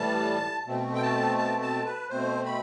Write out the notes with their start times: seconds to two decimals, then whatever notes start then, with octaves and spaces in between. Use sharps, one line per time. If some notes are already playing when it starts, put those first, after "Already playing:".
Already playing: A2 E3 G3 A5
0.66 B2 A3 C4
0.95 G5
1.02 A5
1.38 A5
1.62 A5
1.85 B4
2.09 B2 A3 C4 C5
2.46 B5